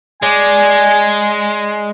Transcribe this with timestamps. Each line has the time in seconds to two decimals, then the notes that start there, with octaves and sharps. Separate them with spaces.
0.23 G#3 D5 G#5